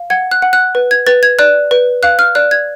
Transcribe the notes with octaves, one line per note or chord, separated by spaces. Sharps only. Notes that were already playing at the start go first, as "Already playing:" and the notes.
Already playing: F5
F#5 G#6
F#6
F#5
F#6
B4
G#6
B4 A6
G#6
D5 F#6
B4
F5 F#6
F6
D5 F#6
G#6